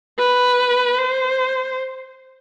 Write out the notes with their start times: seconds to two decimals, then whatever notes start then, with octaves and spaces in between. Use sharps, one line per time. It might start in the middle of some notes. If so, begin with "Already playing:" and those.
0.18 B4
0.99 C5